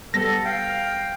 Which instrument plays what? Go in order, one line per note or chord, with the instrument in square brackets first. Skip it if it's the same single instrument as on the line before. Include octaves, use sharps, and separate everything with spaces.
[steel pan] G3 B3 [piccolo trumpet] A4 [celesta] A#6
[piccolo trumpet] F5 [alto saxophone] G5